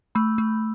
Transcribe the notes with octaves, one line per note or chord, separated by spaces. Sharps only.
A3 B5 E6
A3